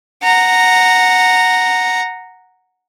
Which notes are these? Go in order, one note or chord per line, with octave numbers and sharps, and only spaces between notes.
F#5 A#5